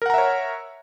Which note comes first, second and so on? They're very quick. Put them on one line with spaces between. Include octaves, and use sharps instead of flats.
A#4 F#5 A#5 E5 C#5